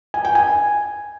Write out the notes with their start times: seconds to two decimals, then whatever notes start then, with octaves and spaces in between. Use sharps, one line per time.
0.14 G#5
0.25 G5
0.35 G#5